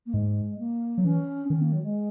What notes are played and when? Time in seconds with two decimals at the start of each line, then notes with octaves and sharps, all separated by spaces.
0.06 A#3
0.14 G#2 G#3
0.59 A#3
0.98 F#3
1.04 E3 C#4
1.50 D#3 C#4
1.61 A#3
1.72 F#3
1.83 G#3